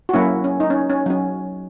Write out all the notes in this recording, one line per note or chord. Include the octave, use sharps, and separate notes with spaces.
F#4
F#3 A#3 C#4 E4
C#4
D#4
C#4
C#4
F#3 C#4